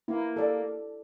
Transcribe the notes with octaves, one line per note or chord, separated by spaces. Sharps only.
A#3 E4
A4 D5